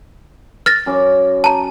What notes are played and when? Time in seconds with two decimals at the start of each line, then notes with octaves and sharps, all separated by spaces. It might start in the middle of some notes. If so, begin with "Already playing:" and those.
0.66 F6 A6 A#6
0.86 F#2 C#4 D6
1.44 A5 A#5